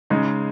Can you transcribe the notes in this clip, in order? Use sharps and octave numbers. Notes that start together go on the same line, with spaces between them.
C#3 G#3 D#4